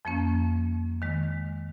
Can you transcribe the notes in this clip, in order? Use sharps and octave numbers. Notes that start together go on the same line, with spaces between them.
F2 F3 A#3 C#4
D#3 G#3